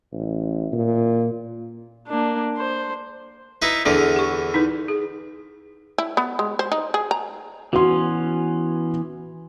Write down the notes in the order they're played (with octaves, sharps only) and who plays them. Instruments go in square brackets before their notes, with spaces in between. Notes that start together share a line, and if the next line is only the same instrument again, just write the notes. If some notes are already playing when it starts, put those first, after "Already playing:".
[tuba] A1
A#2
[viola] A#3 D4
C5
[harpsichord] D#4 E4 B4
[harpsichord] E2 D3 E3 [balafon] D4 G#4 D5
[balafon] G4 C#6
D#4 E4 B4
G#4
[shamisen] E4
B3
G#3
C5
D#4
G#4
A#5
[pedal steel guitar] E3 B3 C#4 [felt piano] F#4 C6